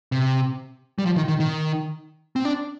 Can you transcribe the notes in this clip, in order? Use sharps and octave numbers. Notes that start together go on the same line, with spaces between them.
C3
G3
F3
D#3
D#3
D#3
C4
D4